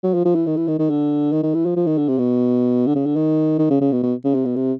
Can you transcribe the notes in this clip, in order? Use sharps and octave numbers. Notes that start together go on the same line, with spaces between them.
F#3
F3
F3
E3
D#3
E3
D#3
D#3
D3
D#3
D#3
E3
F3
F3
D#3
D3
C3
B2
D3
C#3
D3
D#3
D#3
C#3
C#3
B2
B2
C#3
C3
B2
C3